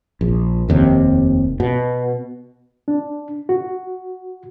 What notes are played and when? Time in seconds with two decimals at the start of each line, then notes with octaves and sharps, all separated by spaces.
0.21 A#1
0.69 F1 D#2 C3
1.60 B2
2.88 D4
3.49 F#4